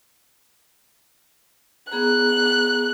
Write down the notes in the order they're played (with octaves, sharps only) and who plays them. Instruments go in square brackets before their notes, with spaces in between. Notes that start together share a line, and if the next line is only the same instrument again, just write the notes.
[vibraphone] B3 G#4 A#5 [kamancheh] F#6